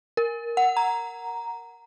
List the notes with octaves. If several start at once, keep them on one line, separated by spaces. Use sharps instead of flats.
A#4
F#5
A#5